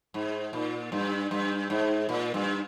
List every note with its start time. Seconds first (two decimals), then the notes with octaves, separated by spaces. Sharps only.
0.14 G#2
0.53 A#2
0.92 G2
1.31 G2
1.70 G#2
2.09 A#2
2.34 G2